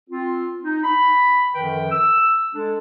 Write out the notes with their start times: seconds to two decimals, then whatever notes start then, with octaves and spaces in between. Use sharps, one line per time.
0.10 C4 F4
0.64 D#4
0.83 B5
1.55 F#2 D3 D#3 F3 B4 G5
1.91 E6
2.55 G#3 D4 A4